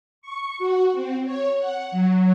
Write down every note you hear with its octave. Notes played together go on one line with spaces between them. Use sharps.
C#6
F#4
C4
C#5
F#5
F#3